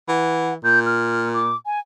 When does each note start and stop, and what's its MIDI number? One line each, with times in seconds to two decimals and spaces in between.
0.08 0.56 52
0.08 0.54 78
0.64 1.55 46
0.64 0.80 91
0.86 1.28 89
1.33 1.56 86
1.66 1.79 80